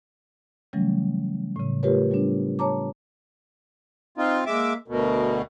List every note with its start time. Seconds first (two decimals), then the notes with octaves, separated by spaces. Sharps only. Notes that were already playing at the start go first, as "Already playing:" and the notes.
0.73 C#3 E3 F#3 G3 A3 C#4
1.56 A2 C#3
1.83 A3 F4 G4 A#4 B4 C#5
2.11 G3 B3 D4
2.59 C#5 A5 A#5 D6
4.18 C4 D#4 F4
4.46 G#3 A#3 E5 D6
4.88 D2 B2 A#4